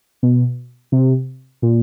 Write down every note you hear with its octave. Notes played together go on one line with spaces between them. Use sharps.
B2
C3
A#2